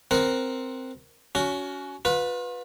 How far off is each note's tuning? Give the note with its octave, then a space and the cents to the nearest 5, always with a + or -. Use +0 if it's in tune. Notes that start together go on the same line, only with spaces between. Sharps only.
C4 +0 A#4 +0 F#5 +0
C#4 +25 F#4 +0
F4 +40 B4 +0